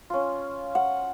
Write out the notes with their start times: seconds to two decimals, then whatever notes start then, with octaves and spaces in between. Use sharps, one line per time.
0.10 C#4 F4
0.75 F#5